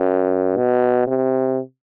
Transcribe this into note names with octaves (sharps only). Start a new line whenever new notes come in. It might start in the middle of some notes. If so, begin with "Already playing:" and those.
Already playing: F#2
B2
C3